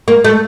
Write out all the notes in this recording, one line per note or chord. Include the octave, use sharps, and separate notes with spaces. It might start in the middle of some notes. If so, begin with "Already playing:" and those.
A#3
A3